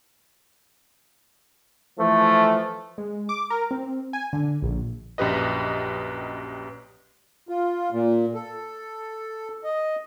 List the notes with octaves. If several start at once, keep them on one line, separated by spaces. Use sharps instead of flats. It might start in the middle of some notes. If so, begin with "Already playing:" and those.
E3 F3 A3
G#3
D6
A#4
C4
G#5
D3
A#1
A#1 F#2 G4 B4 D#5
F4
A#2
A4
D#5